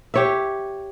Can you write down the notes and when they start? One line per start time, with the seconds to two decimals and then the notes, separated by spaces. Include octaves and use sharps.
0.14 G4 C#5 E5